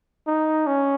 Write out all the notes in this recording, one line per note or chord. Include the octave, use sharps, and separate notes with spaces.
D#4
C#4